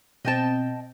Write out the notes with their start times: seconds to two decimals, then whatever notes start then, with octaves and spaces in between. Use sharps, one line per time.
0.25 B2 C4 D#5 G5 A5